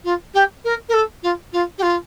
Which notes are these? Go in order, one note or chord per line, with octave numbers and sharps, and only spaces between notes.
F4
G4
A#4
A#4
A4
F4
F4
G4
F4